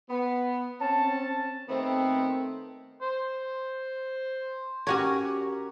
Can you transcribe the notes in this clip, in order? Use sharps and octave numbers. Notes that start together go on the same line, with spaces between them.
B3
C4 C#4 A5
D#3 A3 B3 C4
C5
C#4 F#4 G4 A#4 C#5